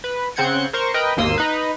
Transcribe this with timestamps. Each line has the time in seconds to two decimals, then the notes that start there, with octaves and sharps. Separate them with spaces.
0.04 B4
0.36 C#3 C4 F#5 G6 G#6 C#7
0.73 A#4 C5 C#6
0.94 A#4 B4 D#5 G5
1.17 G#1 D#2 A#3 C6 D#6 E6
1.38 D#4 B4